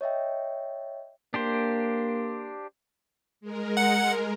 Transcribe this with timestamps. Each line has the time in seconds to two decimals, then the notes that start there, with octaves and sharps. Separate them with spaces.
0.01 C#5 D#5 E5 G5
1.34 A#3 D4 G4 C5
3.41 G#3 A#4
3.77 F#5